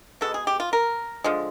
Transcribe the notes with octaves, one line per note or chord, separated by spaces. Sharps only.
B2 G#3 B3 A4
G#4
G4
F4
A#4
D3 F3 G#3